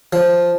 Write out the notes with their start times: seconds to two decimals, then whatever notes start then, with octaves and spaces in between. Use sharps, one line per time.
0.13 F3